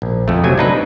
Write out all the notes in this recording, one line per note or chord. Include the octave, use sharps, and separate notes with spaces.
A#1
F2 A3
C3 F#3 G#5
D4 D#4 B4